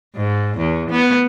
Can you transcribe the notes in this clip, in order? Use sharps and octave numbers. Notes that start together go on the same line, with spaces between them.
G#2
E2
B3